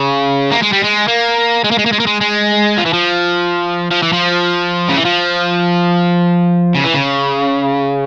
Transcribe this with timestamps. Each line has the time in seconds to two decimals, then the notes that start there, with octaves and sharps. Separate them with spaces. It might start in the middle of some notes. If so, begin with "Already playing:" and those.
Already playing: C#3
0.51 A#3
0.62 G#3
0.72 G3
0.83 G#3
1.08 A#3
1.64 G#3
1.71 A#3
1.79 G#3
1.86 A#3
1.93 G#3
2.00 A#3
2.07 G#3
2.21 G#3
2.78 F3
2.86 E3
2.93 F3
3.91 F3
4.03 E3
4.13 F3
4.89 C#3
4.97 E3
5.05 F3
6.75 C#3
6.84 E3
6.94 C#3